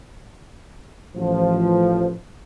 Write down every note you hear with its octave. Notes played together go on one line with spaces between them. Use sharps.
A1 F3